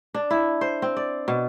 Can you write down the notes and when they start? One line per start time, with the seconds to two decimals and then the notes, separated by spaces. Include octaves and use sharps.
0.15 D4
0.31 E4
0.61 C5
0.82 C4
0.97 D5
1.28 B2